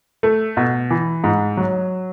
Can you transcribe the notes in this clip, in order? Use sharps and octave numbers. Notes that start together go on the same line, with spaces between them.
A3
B2
E3
G#2
F#3